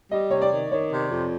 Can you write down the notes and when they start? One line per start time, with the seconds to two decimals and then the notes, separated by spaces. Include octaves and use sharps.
0.11 G3 D#5
0.31 C3 C#5
0.41 D5
0.52 D#3
0.72 D#3 C#5
0.91 C3
1.11 F2